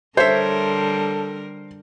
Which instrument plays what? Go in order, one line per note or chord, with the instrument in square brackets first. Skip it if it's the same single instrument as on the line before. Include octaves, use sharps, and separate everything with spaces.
[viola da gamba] D3 G3 A#4 [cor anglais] A4 [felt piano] C5 [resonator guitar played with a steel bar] C#5 E5